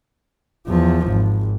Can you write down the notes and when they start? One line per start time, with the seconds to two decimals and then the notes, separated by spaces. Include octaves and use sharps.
0.67 E2 F3
1.08 G#1